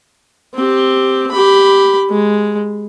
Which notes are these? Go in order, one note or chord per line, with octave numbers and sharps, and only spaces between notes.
C4 G4
G4 B5
G#3